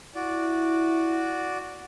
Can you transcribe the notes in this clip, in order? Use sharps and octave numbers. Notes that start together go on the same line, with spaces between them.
E4 F#4 D5